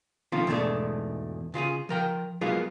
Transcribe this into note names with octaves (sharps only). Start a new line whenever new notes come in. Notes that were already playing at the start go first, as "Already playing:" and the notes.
D#3 F3 A3 C4 C#4 F4
E2 G#2 B2 G#3 A3 D4
C#3 F4 F#4 G#4
F3 A#4 G5
F#3 G#3 A#3 B3 F4 G#4